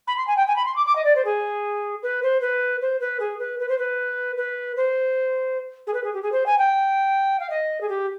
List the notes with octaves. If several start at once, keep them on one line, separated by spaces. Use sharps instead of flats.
B5
C6
G#5
G5
G#5
B5
C6
D6
D6
D#5
D5
C5
G#4
B4
C5
B4
C5
B4
G#4
B4
B4
C5
B4
B4
C5
G#4
B4
G#4
G4
G#4
C5
G#5
G5
F5
D#5
G#4
G4